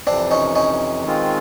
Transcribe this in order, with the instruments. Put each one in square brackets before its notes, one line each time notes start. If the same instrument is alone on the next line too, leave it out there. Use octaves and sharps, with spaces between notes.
[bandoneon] F2 C3 E3 [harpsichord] C4 D4
[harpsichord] C#4 D#4
C#4 D#4
[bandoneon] D#3 G#3 C4 F4